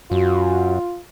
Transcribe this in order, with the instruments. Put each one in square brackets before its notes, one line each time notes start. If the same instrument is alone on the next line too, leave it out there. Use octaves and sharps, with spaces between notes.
[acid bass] F#2 [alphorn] F4 [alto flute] F#4